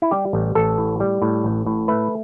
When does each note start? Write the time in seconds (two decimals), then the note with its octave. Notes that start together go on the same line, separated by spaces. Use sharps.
0.02 E4
0.11 G3 G4
0.33 A1
0.55 A1 A4
0.78 A2
1.00 G3
1.22 A2
1.44 A1
1.66 A2
1.88 A3 B4